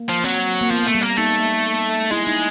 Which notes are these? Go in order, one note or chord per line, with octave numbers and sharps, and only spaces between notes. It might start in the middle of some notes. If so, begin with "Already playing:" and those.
Already playing: A#3
F3
F#3 C4
A#3
F3 B3
A3 A#3
G3
A#3
A3 D#4
G#3 E4
D#4